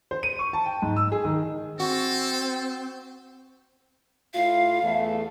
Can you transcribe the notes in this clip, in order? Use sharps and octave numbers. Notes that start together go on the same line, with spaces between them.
C5
D#7
C#6
A5
G5
G#2
E6
G#4
D#3
C4 F#4 A4
A2 E4 F4 F5
E2 A3